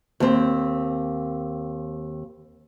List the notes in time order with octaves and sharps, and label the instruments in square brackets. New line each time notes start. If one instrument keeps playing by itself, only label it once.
[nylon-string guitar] D#2 C4